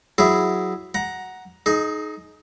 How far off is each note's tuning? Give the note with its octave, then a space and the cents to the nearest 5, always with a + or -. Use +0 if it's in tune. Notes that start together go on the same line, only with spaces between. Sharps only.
F#3 +0 E4 +0 G#4 +0
F#5 +0 A#5 +10
D#4 +0 G#4 +35